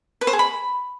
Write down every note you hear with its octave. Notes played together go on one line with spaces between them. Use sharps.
B4
C5
G#4
B5